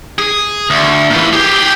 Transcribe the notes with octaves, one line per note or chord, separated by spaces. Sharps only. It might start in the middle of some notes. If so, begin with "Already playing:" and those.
G#4
D2
A#2 E3
G4 G#4